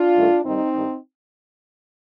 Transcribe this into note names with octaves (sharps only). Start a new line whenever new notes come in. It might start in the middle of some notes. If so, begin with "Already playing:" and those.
Already playing: D4 F4
G2 D#3 A3
G2 D#3 G3 C4 D#4
G2 D#3 G3